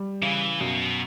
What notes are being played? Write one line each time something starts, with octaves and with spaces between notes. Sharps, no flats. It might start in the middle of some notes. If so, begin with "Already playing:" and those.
Already playing: G3
C#3 E3
F#2 B2